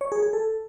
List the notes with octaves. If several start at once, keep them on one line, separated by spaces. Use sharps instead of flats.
C#5
G#4
G#4
A4